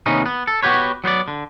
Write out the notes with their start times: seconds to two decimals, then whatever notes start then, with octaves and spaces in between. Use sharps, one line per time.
0.06 D#2 C3 B3 C#4 D#4
0.26 B3
0.47 A4
0.63 B3 F#4 G4 B4 C#5
1.04 F#3 B3 C5 D5
1.28 D3